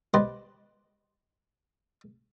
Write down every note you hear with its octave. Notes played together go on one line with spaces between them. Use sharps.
G4 B4 C5 D5 D#5